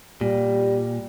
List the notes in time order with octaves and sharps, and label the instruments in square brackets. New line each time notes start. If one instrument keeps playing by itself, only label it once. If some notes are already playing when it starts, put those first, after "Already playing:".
[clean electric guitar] A#2 [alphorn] G3